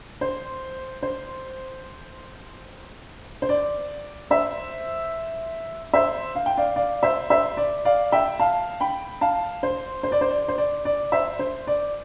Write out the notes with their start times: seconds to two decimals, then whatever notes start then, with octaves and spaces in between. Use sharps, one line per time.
0.21 C5
1.03 C5
3.42 C5
3.49 D5
4.31 C5 E5
5.94 C5 E5
6.35 F5
6.46 G5
6.57 D5 F5
6.76 D5 F5
7.03 C5 E5
7.30 C5 E5
7.57 D5
7.85 D5 F5
8.12 E5 G5
8.39 F5 A5
8.81 G5 B5
9.21 F5 A5
9.63 C5
10.03 C5
10.12 D5
10.21 C5
10.31 D5
10.48 C5
10.58 D5
10.85 D5
11.12 C5 E5
11.39 C5
11.67 D5